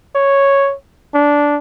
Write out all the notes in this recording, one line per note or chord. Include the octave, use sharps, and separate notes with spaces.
C#5
D4